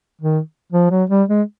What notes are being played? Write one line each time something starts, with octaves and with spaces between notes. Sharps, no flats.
D#3
F3
F#3
G3
G#3